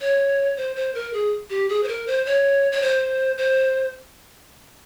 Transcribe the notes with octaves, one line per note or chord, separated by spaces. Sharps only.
C#5
C5
C5
A#4
G#4
G4
G#4
C5
A#4
C5
C#5
C#5
C5
C5